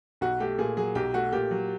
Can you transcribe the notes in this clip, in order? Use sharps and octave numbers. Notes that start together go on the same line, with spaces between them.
B1 F#4
A3 G4
A#2 G#4
F#3 G#4
B1 G4
A3 F#4
A#2 G4
F#3